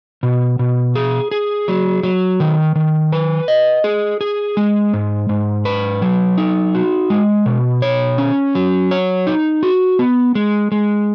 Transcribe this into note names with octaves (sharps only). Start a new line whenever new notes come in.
B2
B2
G#4
G#4
F#3
F#3
D#3
D#3
B4
D#5
G#4
G#4
G#3
G#2
G#2
B4
F#3
D#4
F#4
G#3
B2
C#5
C#4
F#3
C#5
D#4
F#4
B3
G#3
G#3